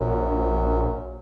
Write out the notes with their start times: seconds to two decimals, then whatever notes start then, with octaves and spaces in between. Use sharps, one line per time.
0.01 A#1 F#2